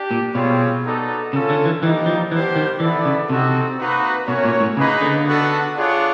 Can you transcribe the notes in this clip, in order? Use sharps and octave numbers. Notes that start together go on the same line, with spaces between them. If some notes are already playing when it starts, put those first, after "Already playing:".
Already playing: D4 G4
A#2
B2 G3 C4 F4 G#4 C#5
B3 D#4 F#4 A4 D5
C#3 C#4 F4 A4
D3
E3
E3 G3 A#3 D#4
F3
E3 G3 B3 D4 G4 C5
D#3
E3 B3 E4 A4 D5
C#3
C3 C4 D#4 F#4 A4
A#3 D#4 F#4 B4
B2 A3 C#4 F#4 A#4 C#5
A#2
A2
C#3 A#3 D#4 G#4 B4 D#5
D3
B3 D4 F#4 A4
D4 F4 G#4 C#5 F#5